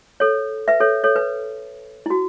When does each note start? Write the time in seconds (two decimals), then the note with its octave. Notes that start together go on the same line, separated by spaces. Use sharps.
0.20 A4 C#5
0.68 B4 E5
0.80 A4 C#5
1.04 A4 C#5
1.16 B4
2.06 E4
2.10 F#4